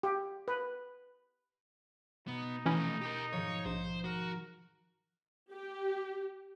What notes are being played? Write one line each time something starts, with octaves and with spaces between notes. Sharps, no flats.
G4
B4
B2 B3 D#4
E3 F3 A3 C#4 E4
G4 A#4
G#2 D#3 F3 C#5
A#1 C5
F#4 A#4
G4